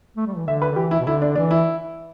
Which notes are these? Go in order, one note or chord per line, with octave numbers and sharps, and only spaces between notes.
A3
G3
E3
D3 E5
B4
D3
E3 G4
E4
B2
D3 E4
D4
E3 D4
E4